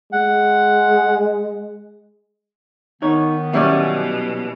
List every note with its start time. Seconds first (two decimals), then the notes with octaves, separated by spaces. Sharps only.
0.12 G#3 F#5
3.02 D#3 B3 D#4 C#5
3.53 B2 E3 F#3 G3 C#4 D5